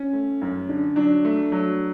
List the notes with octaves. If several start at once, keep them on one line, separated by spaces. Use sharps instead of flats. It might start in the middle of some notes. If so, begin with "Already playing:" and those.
Already playing: C#4
A3
F#2
D3
F#3 D4
A3
F#3